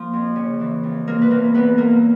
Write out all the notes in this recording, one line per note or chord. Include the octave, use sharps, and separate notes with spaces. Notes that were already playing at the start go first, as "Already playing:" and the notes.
Already playing: F3 A#3
F2
C#3
E3
F2
C3 A#3 A#4
B4
E2 A#3 A#4
E2 B3 B4
E2 A#3 A#4